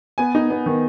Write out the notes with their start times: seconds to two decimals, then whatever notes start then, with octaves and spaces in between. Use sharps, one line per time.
0.18 B3 G#5
0.35 D#4
0.50 B3
0.66 D#3